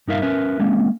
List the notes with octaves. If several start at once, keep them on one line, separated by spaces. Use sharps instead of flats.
G2 D#4 A#4 E5 F5
C#4 A#4 B4 E5
G#3 A#3 C4 C#4